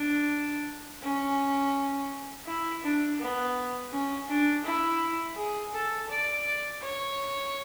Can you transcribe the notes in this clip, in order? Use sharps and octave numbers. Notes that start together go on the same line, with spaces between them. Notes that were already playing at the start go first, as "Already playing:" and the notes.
Already playing: D4
C#4
E4
D4
B3
C#4
D4
E4
G#4
A4
D5
C#5